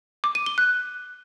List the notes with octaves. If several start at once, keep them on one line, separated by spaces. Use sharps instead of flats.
D6
D#7
G7
F#6